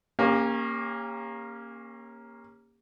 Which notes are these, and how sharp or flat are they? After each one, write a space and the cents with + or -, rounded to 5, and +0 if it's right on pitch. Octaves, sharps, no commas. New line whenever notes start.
A#3 +0 C#4 -20 G4 +35